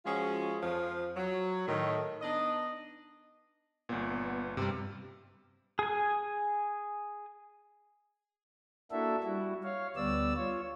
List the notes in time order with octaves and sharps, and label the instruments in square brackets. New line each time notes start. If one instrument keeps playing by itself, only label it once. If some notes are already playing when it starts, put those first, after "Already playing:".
[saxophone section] F3 G#3 C#4 F4 F#4 G#4
F2 F3
F#3
A2 D#3
B3 D4 D#4 D#5
[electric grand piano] G1 A#2 [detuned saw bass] B3
[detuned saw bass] G2 [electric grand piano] C3 G3
[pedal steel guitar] G#4 G#5
[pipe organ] A#3 D4 E4 F#4 A4 E5
G3 E4 F#4
C#5 F5
D2 G3 B3 D5 E6
F4 C#5